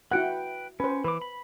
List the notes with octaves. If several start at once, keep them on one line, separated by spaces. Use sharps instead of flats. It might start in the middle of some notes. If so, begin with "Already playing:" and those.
E4 F#4 B4 F#5 G5
C#4 B4 C5
E3 B4 D6
B5